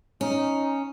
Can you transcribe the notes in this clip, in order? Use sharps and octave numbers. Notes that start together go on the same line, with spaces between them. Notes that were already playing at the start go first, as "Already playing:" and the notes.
C#4 D#4